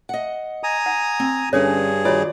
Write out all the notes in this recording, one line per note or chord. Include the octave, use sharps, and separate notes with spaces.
D#5 F#5
G#5 A#5 D#6
F#5
C4
G2 D3 C#4 G#4 B4 C#5
D#3 F4 F#4 C#5 D5